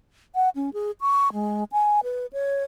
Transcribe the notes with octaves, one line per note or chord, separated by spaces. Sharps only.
F#5
C#4
G#4
C#6
G#3
G#5
B4
C#5